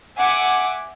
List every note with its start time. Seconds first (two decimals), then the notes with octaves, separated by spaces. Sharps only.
0.17 E5 F#5 G#5 D6